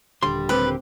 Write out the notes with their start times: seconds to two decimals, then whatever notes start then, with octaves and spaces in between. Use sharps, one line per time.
0.23 D#1 D3 G3 C6
0.49 A#3 C4 G4 B4